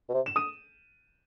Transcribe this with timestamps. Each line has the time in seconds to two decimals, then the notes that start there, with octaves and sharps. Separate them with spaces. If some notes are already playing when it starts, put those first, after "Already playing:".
0.10 B2
0.14 C3
0.26 E7
0.36 D#6 D#7